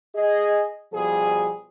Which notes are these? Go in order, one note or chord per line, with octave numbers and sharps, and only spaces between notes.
G#4 D#5
B2 F3 G3 G#4